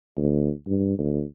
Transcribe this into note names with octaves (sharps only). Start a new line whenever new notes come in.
D2
G2
D2